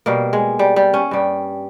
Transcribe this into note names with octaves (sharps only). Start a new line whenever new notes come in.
B2 G3 A#3
G#3
G3
G3
C#4
G2 G3